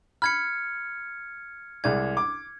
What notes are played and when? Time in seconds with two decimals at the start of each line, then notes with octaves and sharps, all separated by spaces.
0.22 B5 F6 G#6 C#7
1.84 C2 G#3 D5 G#6
2.17 D6